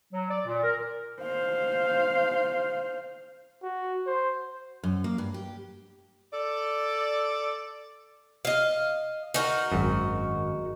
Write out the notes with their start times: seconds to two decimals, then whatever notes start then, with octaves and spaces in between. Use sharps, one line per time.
0.13 F#3
0.30 D5
0.46 A#2
0.63 A#4
1.22 C5 F5
3.63 F#4
4.07 C5
4.83 F#2
5.04 A#3
5.18 G2
5.34 G4
6.32 A4 D5
8.45 D#5 F5
9.34 D#4 F#4 A#4
9.72 G#1 F#2